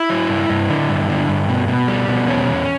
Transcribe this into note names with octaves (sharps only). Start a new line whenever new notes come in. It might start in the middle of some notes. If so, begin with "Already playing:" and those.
Already playing: E4
F#3
G2
G2
D3
G2
D3
G2
B2
B2
G3
B2
E2 C#4
E2